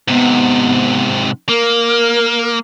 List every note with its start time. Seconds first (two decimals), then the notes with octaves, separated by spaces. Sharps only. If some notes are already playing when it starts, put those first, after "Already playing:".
0.08 G#2 C3 B3
1.49 A#3 A#4